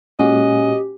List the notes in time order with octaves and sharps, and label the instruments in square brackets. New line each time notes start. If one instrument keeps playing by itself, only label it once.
[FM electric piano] A#2 G#3 F#4 [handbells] C#4 [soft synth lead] G4 [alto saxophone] D#5